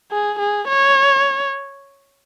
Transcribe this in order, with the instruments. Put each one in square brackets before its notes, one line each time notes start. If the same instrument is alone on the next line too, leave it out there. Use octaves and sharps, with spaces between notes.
[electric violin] G#4
G#4
C#5